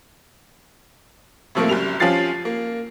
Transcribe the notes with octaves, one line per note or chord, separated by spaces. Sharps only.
A2 C3 F3 A3 A#3
F#1 F#2 G3 F7
F3 C#4 F4 G4 A6 C7
A#3